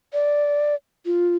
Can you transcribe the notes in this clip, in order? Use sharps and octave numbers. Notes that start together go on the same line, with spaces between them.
D5
F4